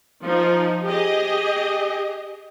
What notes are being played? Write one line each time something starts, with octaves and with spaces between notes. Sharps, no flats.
F3 D#4
G4 G#4 D#5